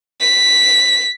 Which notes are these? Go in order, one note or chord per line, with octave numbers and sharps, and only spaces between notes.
B6